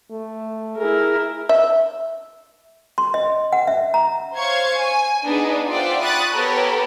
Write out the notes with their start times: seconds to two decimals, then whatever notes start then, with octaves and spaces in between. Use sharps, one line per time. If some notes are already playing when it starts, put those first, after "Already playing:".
0.11 A3
0.78 E4 G#4 A#4
1.49 E5
2.98 C6
3.14 D#5
3.53 F#5
3.67 E5
3.94 A#5
4.36 C5 C#5 F5 C#6 G#6
4.77 G#5
5.23 B3 D4 D#4 G#4
5.69 F4 C5 D5 E5 F#5 G5
6.02 B5 C#6 D#6 F#6 A6
6.33 B3 G4 A4 A#4 C#5 B5